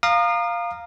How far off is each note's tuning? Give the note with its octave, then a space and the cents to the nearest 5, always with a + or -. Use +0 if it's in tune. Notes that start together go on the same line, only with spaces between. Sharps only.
F5 +0 A#5 +0 D#6 -35